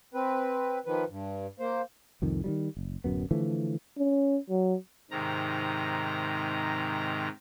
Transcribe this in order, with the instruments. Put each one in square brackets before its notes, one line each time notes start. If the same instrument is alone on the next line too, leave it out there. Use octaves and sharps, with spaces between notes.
[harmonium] C4 B4
D#3 F3 B4
G2
A#3 C5
[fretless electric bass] C2 F2 D#3
D#3 F3 G3
F#1
D1 F#2 B3
D3 E3 F3 A3
[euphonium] C#4
F#3
[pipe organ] G#2 C3 D#3 A#5